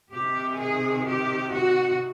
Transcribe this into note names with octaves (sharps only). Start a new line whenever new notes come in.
C3 D#3 G4
G#4
G4
F#4